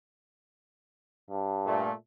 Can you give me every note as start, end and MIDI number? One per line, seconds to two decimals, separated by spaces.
1.31 1.89 43
1.65 1.93 46
1.65 1.93 57